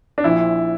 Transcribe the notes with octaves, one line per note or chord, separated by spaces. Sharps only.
D4
A#1 A#2 F3 E4